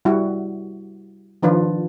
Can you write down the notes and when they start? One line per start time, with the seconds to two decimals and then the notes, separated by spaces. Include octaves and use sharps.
0.05 G3 E4 F#4
1.43 D#3 F3 D4 F4 B4